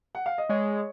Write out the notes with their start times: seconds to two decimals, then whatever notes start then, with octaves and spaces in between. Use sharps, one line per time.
0.15 F#5
0.26 F5
0.38 D#5
0.49 G#3 C#5